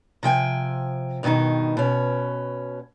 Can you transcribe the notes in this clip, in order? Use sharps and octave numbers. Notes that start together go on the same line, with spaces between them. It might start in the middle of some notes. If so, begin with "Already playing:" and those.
C3 F3 G5 G#5
G2 B2 D3 D#3 D#4
B2 C#4